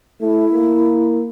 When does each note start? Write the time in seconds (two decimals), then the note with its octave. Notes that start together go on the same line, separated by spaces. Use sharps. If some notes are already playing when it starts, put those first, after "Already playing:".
0.21 A3 E4
0.53 A#3